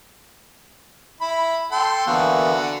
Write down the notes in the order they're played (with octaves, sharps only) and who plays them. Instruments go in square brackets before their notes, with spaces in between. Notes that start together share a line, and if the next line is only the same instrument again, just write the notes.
[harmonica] E4 B5
A4 G5 C6
[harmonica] D3 F#4 [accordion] E3 A#3 B3